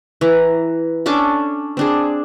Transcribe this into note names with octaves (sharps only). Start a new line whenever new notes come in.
E3 A#5
C#4 D4 A4 D6
C4 D4 G#4